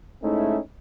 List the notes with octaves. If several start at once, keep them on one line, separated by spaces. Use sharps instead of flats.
G#2 A3 C#4 D#4 E4